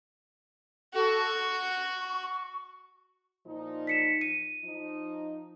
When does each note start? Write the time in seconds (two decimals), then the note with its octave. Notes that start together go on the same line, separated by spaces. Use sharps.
0.94 F#4 A4
1.52 C#6
3.46 A#2 F3 D#4
3.87 B6 C#7 E7
4.21 D#7
4.64 F3 D#4